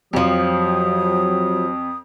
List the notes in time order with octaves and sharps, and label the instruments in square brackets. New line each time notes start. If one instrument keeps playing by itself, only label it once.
[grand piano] F2 [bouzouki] F3 G4 [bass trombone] F#3 [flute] D#6